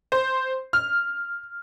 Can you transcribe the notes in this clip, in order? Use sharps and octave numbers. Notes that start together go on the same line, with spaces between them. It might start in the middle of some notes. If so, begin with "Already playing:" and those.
C5
F6